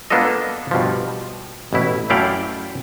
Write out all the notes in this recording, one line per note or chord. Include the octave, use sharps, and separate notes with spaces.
A#3 B3 D4 F4 A4 D#5
G2 B2 F3
A1 B2 E4
F#2 A3 E4 D5 F5 G5